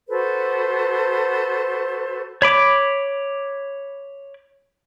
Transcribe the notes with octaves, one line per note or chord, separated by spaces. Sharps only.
F#4 A4 B4 C5
C#5 B5 D6